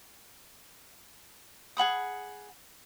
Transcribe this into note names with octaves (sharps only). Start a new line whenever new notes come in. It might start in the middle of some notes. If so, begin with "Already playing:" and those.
G#4 F#5 B5 D#6